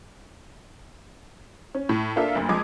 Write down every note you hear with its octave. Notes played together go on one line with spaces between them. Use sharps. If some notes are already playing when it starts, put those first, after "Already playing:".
C#4
A2
A#3 D4 F4 A4 A#4 E5
F#1 D2
F2 G#3 D6 D#6 G#6